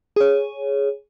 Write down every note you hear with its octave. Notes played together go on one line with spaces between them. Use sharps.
G#4 C#5